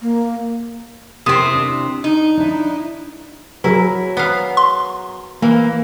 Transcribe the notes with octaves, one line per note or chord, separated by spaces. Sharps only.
A#3
C3 A#3 C4 E4 D#6
D4
D#4
D4 E4
F#3 E4 G#4 A#4
B3 F5
C6
E3 A#3